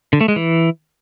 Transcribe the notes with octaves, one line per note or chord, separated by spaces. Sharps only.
D3
A3
G#3
E3